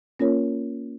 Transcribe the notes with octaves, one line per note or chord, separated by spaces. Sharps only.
A#3 C#4 F4 A#4 C#5